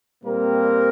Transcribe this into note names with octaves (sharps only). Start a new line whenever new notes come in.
A#2 G3 A#3 C4 A#4